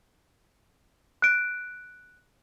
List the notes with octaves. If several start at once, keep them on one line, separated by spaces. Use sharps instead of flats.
F#6 D7